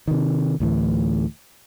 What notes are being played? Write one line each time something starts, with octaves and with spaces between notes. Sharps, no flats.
C3 D#3
D2 A2 E3